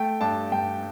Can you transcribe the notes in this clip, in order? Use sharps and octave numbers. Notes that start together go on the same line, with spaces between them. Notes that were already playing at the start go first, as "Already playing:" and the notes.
Already playing: A3 G5
G2 A5
G2 G5